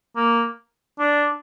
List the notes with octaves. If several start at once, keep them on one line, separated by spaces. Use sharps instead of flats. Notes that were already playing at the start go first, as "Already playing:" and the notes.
A#3
D4